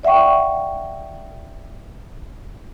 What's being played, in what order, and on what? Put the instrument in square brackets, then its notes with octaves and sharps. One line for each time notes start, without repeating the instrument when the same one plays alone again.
[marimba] D5 E5 F#5 G5 C#6